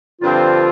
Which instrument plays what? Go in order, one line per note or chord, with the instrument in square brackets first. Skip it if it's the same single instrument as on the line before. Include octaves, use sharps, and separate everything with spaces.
[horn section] G2 D3 F3 C4 [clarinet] F4